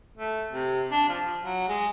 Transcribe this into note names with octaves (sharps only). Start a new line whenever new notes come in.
A3
C3
D4
F3
F3
F#3
G#3